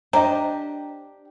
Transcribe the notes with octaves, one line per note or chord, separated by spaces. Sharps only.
D4 G4 C5 D#5 A#5